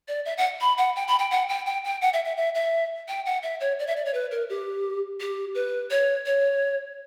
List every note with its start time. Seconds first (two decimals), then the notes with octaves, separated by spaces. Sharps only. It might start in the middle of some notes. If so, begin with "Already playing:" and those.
0.08 D5
0.25 E5
0.38 F#5
0.61 B5
0.78 F#5
0.96 G5
1.08 B5
1.19 G5
1.31 F#5
1.49 G5
1.66 G5
1.84 G5
2.02 F#5
2.13 E5
2.25 E5
2.37 E5
2.55 E5
3.08 G5
3.26 F#5
3.43 E5
3.60 C#5
3.79 D5
3.87 E5
3.96 D5
4.05 C#5
4.14 B4
4.31 A#4
4.50 G4
5.20 G4
5.55 B4
5.91 C#5
6.26 C#5